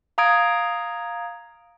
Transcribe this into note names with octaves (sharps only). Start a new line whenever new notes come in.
F5 A#5 D#6 G#6 D7